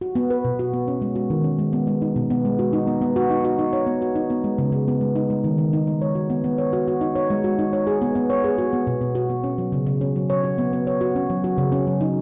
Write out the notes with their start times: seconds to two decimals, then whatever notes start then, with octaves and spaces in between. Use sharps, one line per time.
0.01 F#4
0.15 B3
0.30 B4
0.45 B2
0.59 F#4
0.73 B3
0.88 C#4
1.02 G#3
1.16 F#4
1.30 D#3
1.44 C#4
1.59 G#3
1.73 B3
1.87 G#3
2.02 D#4
2.16 B2
2.30 B3
2.45 G#3
2.59 F#4
2.73 D#4
2.87 B3
3.02 B3
3.16 F#4
3.30 D#4
3.45 F#4
3.59 D#4
3.73 C#5
3.87 B3
4.02 F#4
4.15 D#4
4.30 B3
4.44 G#3
4.58 C#3
4.72 C#3
4.88 B3
5.01 G#3
5.16 D#4
5.30 G#3
5.44 D#3
5.58 D#3
5.73 D#4
5.87 G#3
6.02 C#5
6.15 F#4
6.30 B3
6.44 B3
6.58 C#5
6.73 F#4
6.88 F#4
7.01 D#4
7.16 C#5
7.30 G#3
7.44 F#4
7.59 D#4
7.73 C#5
7.87 G#4
8.02 B3
8.15 B3
8.30 C#5
8.44 G#4
8.58 F#4
8.73 B3
8.87 B2
9.01 B2
9.15 F#4
9.30 B3
9.44 C#4
9.58 F#3
9.72 C#3
9.87 C#3
10.01 C#4
10.16 F#3
10.30 C#5
10.44 F#4
10.58 B3
10.73 B3
10.87 C#5
11.01 F#4
11.15 C#4
11.30 F#3
11.44 F#4
11.58 C#3
11.72 C#4
11.87 F#3
12.01 D#4